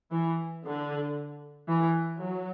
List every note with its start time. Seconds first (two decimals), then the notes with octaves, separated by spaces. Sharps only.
0.12 E3
0.65 D3
1.68 E3
2.20 F#3